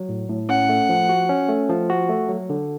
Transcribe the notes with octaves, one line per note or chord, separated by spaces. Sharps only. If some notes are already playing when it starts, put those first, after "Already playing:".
Already playing: F#3
A2
A2
C#4 F#5
A3
F3
F#4
C#4
A3
F3
F#4
A3
F#3
D3